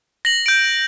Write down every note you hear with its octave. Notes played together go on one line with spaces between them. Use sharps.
A#6 F#7
G6 D7